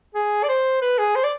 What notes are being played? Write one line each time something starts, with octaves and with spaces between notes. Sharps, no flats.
G#4
D5
C5
B4
G#4
C5
D5